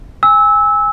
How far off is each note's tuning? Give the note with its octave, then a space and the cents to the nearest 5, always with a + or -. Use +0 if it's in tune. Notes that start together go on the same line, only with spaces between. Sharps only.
G#5 -15 E6 -20